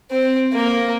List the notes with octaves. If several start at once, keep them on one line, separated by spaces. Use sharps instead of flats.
C4
A#3